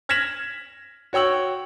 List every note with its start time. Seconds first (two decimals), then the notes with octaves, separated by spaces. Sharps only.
0.09 F6 G#6 A#6 B6 E7 F#7
1.13 F#4 C#5 G5 E6 F#7